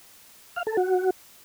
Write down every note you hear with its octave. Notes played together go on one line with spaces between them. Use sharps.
F5
A4
F#4